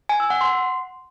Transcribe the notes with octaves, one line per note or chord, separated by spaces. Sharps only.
G#5
E6
F#5
C6